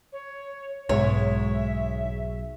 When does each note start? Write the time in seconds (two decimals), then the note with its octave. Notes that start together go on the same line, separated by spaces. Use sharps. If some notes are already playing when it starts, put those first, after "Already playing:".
0.12 C#5
0.89 B1 G#2 G#3 C#5 E5